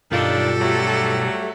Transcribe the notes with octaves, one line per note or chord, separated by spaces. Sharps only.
B1 G2 D#3 D4 F4 G4 A4
F#3 G3 A3